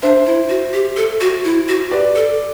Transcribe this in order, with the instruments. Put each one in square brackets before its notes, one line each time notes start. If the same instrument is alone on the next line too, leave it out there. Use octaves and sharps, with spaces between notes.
[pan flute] D4 [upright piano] C5 E5
[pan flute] E4
F#4
G4
A4
F#4
E4
F#4
[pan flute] G4 [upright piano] B4 D5
[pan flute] A4